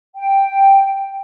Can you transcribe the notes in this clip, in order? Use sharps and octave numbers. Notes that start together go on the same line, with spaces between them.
G5